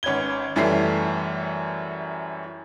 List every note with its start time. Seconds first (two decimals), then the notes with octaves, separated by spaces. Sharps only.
0.03 G#1 C#4 B4 G#6 G7
0.56 F#2 E3 G3 A3 C7